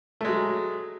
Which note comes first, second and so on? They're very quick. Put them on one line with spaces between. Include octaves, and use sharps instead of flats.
A3 G#3 F#3